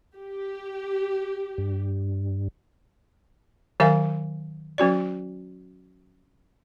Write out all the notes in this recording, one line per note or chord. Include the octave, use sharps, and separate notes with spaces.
G4
G2
D#3 F#3 A#4 E5 F5 G#5
F#3 C#4 F#4 D5